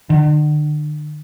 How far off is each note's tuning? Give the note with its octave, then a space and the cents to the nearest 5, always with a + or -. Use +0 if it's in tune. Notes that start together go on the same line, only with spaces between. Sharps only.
D3 +40